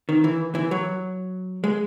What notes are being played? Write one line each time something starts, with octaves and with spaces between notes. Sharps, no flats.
D#3
E3
E3
F#3
G#3